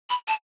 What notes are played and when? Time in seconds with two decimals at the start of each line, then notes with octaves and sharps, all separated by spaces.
0.10 B5
0.28 A5